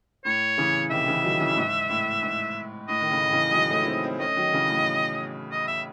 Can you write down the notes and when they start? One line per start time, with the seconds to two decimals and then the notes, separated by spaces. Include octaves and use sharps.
0.25 A2 C#5
0.58 C#3 E3
0.91 C3 D#3 E5
1.07 C#3 E3
1.24 D#3 F#3
1.40 C#3 E3
1.57 G#2
1.89 A2
2.22 G#2
2.88 A2 D#5
3.01 D#3
3.11 A2 C#3
3.26 D#3
3.32 C#3 E3
3.51 G#3
3.54 D#3 F#3
3.70 A3 C#4
3.83 E4
3.87 C4 D#4
4.03 C4 D#4
4.19 A3 C#4 D#5
4.36 D#3 F#3
4.53 C#3 E3
4.69 A2
5.51 D#5
5.67 E5